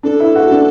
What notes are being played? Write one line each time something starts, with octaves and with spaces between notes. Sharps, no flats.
D4 A4
E4
F#4
D4